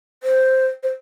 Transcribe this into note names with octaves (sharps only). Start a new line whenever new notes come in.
C5
C5